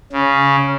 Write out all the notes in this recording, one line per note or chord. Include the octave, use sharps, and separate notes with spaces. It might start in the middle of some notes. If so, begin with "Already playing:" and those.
C#3